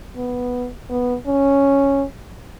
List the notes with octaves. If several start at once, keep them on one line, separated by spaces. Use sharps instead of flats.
B3
B3
C#4